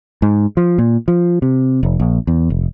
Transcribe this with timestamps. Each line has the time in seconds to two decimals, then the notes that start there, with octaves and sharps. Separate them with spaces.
0.22 G#2
0.57 F3
0.78 A#2
1.08 F3
1.42 C3
1.83 F1
2.00 A#1
2.27 E2
2.50 F1